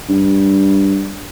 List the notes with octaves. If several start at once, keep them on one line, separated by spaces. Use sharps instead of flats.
G2